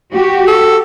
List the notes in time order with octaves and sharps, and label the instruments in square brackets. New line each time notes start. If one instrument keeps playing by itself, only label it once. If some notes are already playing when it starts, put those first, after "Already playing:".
[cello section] F#4 G4
[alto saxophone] A4